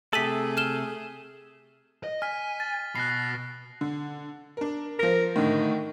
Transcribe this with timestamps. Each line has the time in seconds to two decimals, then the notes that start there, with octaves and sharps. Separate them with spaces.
0.13 C3 A3 G#4 A4 B6 D#7 F#7
0.57 F6 E7 G7
2.04 D#5
2.22 G#5 F6 B6
2.60 A6
2.95 B2 B5 F#6 A#6 C7
3.81 D3
4.57 D4 A#4
4.99 F3 A#4 A#6
5.36 A2 D3 D#3